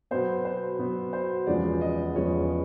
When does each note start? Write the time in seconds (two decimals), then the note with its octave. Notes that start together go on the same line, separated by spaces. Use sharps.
0.11 B2 F#3 B3 C5
0.45 C5
0.79 B2 F#3 B3
1.13 C5
1.47 E2 C#3 F3 G#3 B3 D5
1.81 D#5
2.16 E2 C#3 F3 G#3 B3 C#5